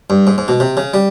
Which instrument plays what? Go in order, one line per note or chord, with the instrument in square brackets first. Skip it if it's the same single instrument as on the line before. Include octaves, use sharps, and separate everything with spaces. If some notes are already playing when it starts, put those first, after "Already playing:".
[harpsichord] G2
G#2
G#2
B2
C3
C#3
G3